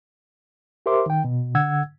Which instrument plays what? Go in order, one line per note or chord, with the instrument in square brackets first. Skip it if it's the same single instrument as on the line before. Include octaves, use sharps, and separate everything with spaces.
[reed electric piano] G4 A#4 C5 E5 C6 D6
D#3 G5
B2
D3 F#5 E6 G#6